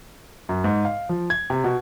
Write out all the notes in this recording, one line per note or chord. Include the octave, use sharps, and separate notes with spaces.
F#2
G#2
F5
F3
G#6
C3
B2